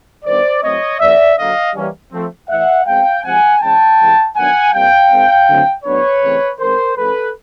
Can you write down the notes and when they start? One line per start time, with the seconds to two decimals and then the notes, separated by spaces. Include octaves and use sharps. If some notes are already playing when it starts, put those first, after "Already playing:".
0.25 D#3 G3 B3 D4 C5 D5
0.62 A2 F#3 A3 C4 C#5 D#5
1.00 C#3 F3 A#3 D5 E5
1.37 D3 F#3 A#3 D#5 F5
1.74 E3 G3 A#3 C#4
2.12 F3 A3 C4
2.49 A2 E3 A3 E5 F#5
2.86 B2 G#3 C4 F5 G5
3.23 C3 F3 G#3 C4 F#5 G#5
3.61 C#3 E3 G#3 C#4 G5 A5
3.99 C3 E3 G#3
4.35 D#3 F#3 B3 D4 F#5 G#5
4.72 A#2 G3 C4 F5 G5
5.10 D#3 G#3 C4
5.48 D3 F#3 A3 C4
5.84 A2 F#3 B3 D4 B4 C#5
6.22 C#3 E3 A3 C4
6.59 D#3 G#3 C4 A#4 C5
6.96 F3 A3 C#4 A4 B4